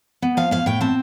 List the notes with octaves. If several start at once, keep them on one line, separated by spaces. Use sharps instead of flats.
B3
F3 F5
A2 F5
A2 G5
C4 A5